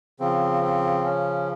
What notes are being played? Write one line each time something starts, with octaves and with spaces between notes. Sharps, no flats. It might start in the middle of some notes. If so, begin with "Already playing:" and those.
C#3 F3 C4
C4
C#4